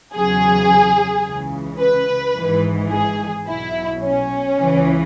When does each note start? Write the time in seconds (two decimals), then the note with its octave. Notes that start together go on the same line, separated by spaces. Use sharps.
0.13 E2 C#3 F#3 G#4
1.24 C#2 C#3 E3
1.80 B4
2.36 G#1 G#2 E3
2.90 G#4
3.47 B1 B2 F#3 E4
4.02 C#4
4.58 C#2 C#3 E3